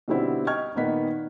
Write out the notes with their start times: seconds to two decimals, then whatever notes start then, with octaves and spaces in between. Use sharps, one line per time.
0.08 B2 D3 G3 B3 C4 E4
0.47 D#5 G5 C#6 F6 G#6
0.76 A#2 D#3 A#3 B3 D#4 B6